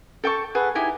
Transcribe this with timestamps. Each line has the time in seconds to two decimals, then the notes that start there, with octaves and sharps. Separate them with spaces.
0.24 A4 G5 A5 C#6
0.55 G#4 A4 B4 F#5
0.75 D#4 E4 G4 G#5